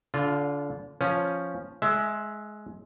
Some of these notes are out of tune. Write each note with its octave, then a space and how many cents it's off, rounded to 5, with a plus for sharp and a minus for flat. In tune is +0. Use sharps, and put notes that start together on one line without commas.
D3 -30 F4 +0
F3 +0 C#4 +0
G#3 +20 E5 +0